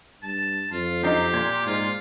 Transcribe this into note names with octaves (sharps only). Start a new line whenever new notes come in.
G2 A5
F2 F4
F#2 D#4 G4 C7
A#2 G#6
G#2 F4